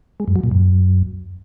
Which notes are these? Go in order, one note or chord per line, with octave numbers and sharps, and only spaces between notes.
G#3
F#2
F#3
A#2
F#2